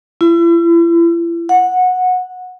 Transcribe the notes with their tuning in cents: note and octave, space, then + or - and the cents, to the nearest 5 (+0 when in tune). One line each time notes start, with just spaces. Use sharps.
E4 +40
F#5 -15